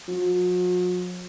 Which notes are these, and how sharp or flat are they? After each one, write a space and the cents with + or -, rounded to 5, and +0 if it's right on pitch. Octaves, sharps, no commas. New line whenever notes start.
F#3 -45